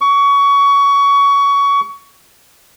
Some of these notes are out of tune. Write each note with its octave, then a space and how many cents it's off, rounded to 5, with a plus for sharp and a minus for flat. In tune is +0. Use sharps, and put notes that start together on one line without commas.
C#6 +25